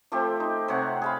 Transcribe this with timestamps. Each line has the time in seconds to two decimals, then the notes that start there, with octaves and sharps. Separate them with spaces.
0.12 F3 A3 C4 G4
0.40 D#4
0.68 C3 C4 C#5 F#5
1.02 G#4 F5 B5